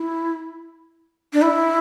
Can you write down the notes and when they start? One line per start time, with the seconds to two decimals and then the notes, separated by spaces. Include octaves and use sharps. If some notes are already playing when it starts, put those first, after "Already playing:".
Already playing: E4
1.33 D4
1.42 E4